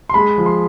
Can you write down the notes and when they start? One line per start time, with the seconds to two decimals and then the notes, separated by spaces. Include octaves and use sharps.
0.09 C6
0.14 G#3 B5
0.38 F3
0.46 C6